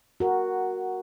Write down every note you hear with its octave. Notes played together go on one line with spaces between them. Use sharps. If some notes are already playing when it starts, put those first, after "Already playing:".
F#4 A#4